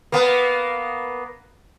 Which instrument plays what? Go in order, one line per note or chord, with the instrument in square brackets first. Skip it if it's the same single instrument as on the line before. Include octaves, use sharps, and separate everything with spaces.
[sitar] A#3 B3